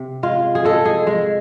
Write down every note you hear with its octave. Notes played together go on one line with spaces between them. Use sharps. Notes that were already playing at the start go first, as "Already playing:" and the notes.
Already playing: C3
G#3 F4
G#4
G#3 A4
G#4
G#3